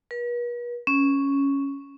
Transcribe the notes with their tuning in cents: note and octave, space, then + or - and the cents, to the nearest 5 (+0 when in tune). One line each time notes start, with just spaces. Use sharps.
B4 -45
C#4 +0